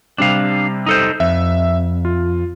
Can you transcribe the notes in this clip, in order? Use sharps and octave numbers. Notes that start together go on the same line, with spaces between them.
C3 G3 C4 D4 F5
D#4 A4 C5
F2 E5
F4